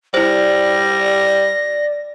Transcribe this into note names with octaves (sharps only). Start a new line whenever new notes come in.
G3 E4 C5 D5 A#6